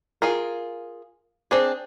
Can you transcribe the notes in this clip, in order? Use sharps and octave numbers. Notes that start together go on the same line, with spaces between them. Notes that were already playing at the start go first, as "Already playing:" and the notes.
F4 G#4 A#4
C4 D4 G#4